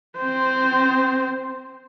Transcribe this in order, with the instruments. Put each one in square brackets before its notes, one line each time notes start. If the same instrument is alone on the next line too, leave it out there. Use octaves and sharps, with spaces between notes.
[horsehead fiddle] C4 C5